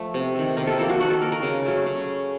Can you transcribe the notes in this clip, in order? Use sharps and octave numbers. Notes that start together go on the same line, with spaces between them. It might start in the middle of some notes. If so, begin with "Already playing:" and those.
Already playing: F3 A3
C3
D#3 A3
C3 A#4
A4
F3 A#3 A4
F#4
D#3 F#4
A4
A#3 A#4
A#4
C#3
F#3 A3
C#3